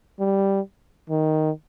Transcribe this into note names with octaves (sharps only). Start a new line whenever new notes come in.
G3
D#3